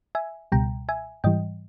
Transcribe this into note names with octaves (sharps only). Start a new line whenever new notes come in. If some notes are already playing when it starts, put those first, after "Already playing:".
E5 G#5
C#2 B2 G3 G5 A#5
E5 G#5
G#2 E3 G3 D#5 G5